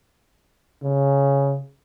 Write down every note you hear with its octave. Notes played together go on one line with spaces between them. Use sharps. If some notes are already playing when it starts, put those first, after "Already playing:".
C#3